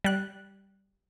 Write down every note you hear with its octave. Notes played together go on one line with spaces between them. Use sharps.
G3 F#6